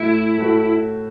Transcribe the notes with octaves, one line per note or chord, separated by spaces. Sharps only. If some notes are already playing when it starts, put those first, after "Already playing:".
Already playing: A2 A3 E4 F#4 A4
A2 A3 F#4 A4